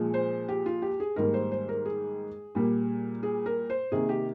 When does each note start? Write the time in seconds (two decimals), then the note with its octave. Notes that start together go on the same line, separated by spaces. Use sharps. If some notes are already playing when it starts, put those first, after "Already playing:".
Already playing: A#2 F3 G#3
0.14 C5
0.49 G4
0.66 F4
0.82 G4
1.00 G#4
1.16 G#2 D#3 G3 A#3 A#4
1.34 C5
1.51 C5
1.69 A#4
1.85 G#4
2.55 A#2 G3 A#3
3.23 G#4
3.46 A#4
3.70 C5
3.91 C3 D#3 A#3 G#4
4.09 G4